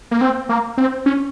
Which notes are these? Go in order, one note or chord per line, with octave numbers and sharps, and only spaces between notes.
A#3
C4
A#3
C4
C#4